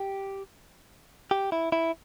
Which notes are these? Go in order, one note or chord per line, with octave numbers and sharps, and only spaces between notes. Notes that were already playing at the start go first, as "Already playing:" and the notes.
Already playing: G4
G4
E4
E4